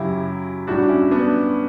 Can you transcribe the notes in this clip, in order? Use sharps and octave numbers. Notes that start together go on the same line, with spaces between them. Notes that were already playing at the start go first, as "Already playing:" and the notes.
Already playing: F#2 C#3 F#3 E4 G4
A2 G3 D4 F#4
C#4 E4
B3 D4